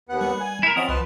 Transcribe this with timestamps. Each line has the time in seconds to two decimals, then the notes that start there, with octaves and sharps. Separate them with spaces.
0.09 D#2 B3 F#5
0.21 G3
0.40 G#5
0.63 E4 A#4
0.76 F3 C4 C#4 D#5 F#5 D#6
0.89 C2 B4